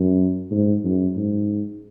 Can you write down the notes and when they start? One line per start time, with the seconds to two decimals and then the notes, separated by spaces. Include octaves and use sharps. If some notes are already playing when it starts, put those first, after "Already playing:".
Already playing: F#2
0.51 G#2
0.84 F#2
1.16 G#2